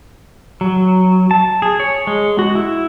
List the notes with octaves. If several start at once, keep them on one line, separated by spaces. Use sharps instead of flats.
F#3
A5
G#4
C#5
G#3
F#4
E4